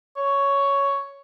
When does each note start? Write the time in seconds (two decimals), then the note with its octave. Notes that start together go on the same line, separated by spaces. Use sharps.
0.16 C#5